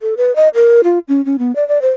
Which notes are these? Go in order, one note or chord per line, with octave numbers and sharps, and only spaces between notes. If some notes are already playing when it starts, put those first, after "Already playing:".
A4
B4
D#5
A#4
F4
C#4
C#4
B3
D5
D5
C5